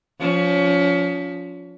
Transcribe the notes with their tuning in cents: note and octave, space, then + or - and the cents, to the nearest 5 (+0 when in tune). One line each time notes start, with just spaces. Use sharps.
F3 +15 C#4 +30